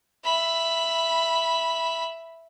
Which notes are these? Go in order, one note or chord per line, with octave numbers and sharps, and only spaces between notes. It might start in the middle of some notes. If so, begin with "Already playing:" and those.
E5 B5